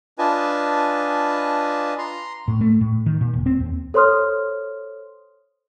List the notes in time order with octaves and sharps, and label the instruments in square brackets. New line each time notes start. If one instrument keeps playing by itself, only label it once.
[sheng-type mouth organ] D4 F4 B4 D#5 G#5 A5
A#5 C6
[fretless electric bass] A2
A3
A2
D#3
A#2
E1
C4
D#2
[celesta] A4 C5 C#5 C6 D#6 F6